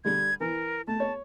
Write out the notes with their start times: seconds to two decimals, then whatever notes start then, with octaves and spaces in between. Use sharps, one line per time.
0.05 D3 G3 G#6
0.40 E3 A#4
0.87 A3 A5
1.00 C#5